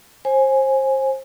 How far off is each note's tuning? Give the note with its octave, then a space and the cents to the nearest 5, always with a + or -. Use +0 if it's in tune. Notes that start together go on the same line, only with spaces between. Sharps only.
C5 +30 G#5 +0